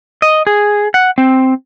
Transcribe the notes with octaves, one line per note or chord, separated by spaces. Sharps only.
D#5
G#4
F#5
C4